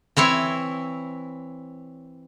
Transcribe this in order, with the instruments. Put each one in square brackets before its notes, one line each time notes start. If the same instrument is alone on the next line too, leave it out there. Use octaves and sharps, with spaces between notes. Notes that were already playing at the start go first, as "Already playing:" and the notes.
[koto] E3 C4 E4 C#5